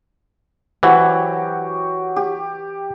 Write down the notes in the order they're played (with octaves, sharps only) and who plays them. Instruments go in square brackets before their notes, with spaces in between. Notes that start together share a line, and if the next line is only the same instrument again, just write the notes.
[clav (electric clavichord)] E3 [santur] F#3 F#4 G4 [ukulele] C5 F#5
[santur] G4